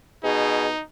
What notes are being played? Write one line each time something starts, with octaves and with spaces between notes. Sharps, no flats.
B2 D#4 G#4